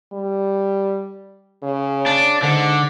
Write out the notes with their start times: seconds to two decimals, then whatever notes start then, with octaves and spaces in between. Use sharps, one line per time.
0.13 G3
1.63 C#3
2.06 D4
2.43 G#2 D3